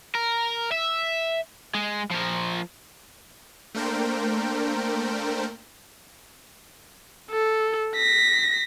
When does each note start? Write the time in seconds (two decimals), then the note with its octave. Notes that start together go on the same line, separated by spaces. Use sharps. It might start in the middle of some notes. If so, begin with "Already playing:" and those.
0.15 A#4
0.71 E5
1.74 G#3
2.11 F3 A#4
3.74 A3 A#3 D4 A#4 C5 G5
7.31 A4
7.96 A#6 B6